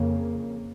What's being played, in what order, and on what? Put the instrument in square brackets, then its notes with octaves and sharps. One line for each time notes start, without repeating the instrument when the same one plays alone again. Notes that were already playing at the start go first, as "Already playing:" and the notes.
Already playing: [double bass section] F2 C#3 A#3